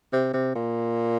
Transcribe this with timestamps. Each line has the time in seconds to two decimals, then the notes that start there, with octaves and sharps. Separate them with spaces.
0.13 C3
0.34 C3
0.55 A#2